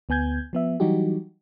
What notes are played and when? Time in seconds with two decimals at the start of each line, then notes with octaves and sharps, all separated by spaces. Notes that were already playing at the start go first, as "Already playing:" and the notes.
0.09 D2 B3 G#5 G6 G#6
0.53 F3 B3 E5
0.80 E3 F#3 G3 D#4 F#4 G4